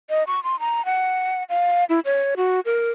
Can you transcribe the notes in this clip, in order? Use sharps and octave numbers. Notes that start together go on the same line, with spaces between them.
D#5
C#6
C6
A#5
F#5
F5
E4
C#5
F#4
A#4